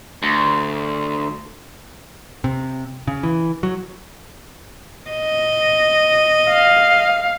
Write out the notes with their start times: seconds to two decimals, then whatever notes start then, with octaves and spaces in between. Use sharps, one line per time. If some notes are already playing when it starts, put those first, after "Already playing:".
0.23 D2
2.44 C3
3.07 C#3
3.23 E3
3.63 F#3
5.11 D#5
6.51 F5